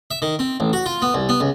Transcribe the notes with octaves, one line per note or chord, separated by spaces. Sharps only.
E5
D#3
C4
A1
F#4
F4
B3
C2
B3
C#2